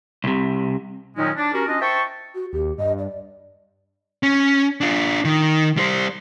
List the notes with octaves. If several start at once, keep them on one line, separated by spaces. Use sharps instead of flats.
C2 C3
A#2 D#3 F#3 G#3 C#4 D#4
D4
C#4 F#4 G4 A#4
C#4 D4 F4 D#5
C5 E5 G5 A5 C#6
F#4
D#2 G4
G2 D#5
D5
C#4
D4 F4
D#3
G3 C5